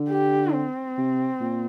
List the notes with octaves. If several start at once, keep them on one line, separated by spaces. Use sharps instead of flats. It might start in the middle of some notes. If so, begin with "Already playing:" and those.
Already playing: D3
G4
C4
C3
A#2